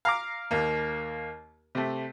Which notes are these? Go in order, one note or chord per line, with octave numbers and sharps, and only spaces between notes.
F5 A#5 D6
D#2 A#3
C3 A3